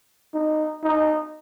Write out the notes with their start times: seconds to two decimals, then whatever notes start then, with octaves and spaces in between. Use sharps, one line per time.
0.34 D#4
0.84 D#4